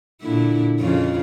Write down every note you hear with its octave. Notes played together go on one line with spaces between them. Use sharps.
A#2 D3 E4
F2 C#3 F4